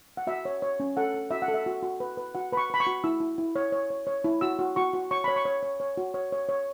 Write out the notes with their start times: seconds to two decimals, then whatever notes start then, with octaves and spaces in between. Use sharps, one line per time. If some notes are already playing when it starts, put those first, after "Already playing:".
0.17 F#5
0.27 F#4 E5
0.45 C#5
0.62 C#5
0.80 C#4
0.97 A4 F#5
1.14 A4
1.31 F#4 E5
1.42 F#5
1.48 A4
1.54 E5
1.66 F#4
1.82 F#4
2.00 B4
2.17 B4
2.35 F#4 F#5
2.53 B4 B5
2.57 C#6
2.70 B4 B5
2.80 C#6
2.87 F#4
3.04 E4 E6
3.20 E4
3.38 E4
3.56 C#5
3.72 C#5
3.90 C#5
4.07 C#5
4.24 E4
4.41 F#4 E6
4.59 F#4
4.76 F#4 C#6
4.93 F#4
5.11 C#5 C#6
5.24 C#5 B5
5.36 C#6
5.45 C#5
5.63 C#5
5.80 C#5
5.97 F#4
6.14 C#5
6.32 C#5
6.49 C#5